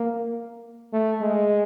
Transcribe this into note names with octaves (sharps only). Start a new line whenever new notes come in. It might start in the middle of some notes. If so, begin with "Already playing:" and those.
Already playing: A#3
A3
G#3